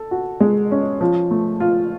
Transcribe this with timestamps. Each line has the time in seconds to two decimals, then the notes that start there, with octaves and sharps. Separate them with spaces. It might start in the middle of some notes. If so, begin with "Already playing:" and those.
Already playing: A4
0.11 F#4
0.40 G#3
0.72 C#4
1.01 F3
1.31 A3
1.60 F4